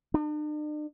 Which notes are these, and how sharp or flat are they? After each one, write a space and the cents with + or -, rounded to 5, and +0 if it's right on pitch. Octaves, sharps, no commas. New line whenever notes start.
D4 +45